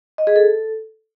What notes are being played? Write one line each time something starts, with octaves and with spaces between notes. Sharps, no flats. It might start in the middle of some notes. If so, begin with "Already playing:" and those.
D#5
G#4
A4